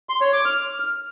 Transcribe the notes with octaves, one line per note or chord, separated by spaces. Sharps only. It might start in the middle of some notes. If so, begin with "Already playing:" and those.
C6
C#5
D6
F6